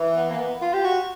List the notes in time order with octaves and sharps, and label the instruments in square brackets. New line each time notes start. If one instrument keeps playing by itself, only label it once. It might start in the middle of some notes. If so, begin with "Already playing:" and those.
Already playing: [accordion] E3
[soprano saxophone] B3
A#3
B3
F4
G4
F#4